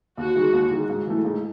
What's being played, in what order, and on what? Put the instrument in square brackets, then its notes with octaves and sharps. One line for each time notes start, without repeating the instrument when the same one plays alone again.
[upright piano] D#2 [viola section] F#4
[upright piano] D#3 G#3
D#2
D#3 G#3
G#2
E3 A3
G#2